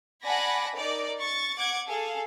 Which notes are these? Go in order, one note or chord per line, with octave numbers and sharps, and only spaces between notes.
D5 F#5 G#5 A5 B5 A#6
D#4 A#4 D5
C#6 A6
F#5 D6 G#6
G#4 A4 F5